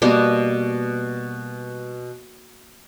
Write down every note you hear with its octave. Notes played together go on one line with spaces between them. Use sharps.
B2 G3 A#3 B3